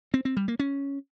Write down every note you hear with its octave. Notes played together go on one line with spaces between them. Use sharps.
C4
C4
G3
A#3
C#4